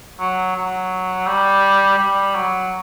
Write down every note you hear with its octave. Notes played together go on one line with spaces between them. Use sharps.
F#3
F#3
G3
G3
F#3